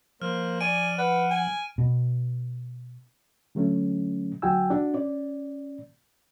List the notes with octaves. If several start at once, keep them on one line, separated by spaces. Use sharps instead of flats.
F3 A#3 C5 F6
D5 G#5 D7 D#7
B4 F#5
G#5
B2
D3 F#3 A3 C#4
D2 F#3 F#4 G5 G#5 E6
D4 F#4
C#4 D5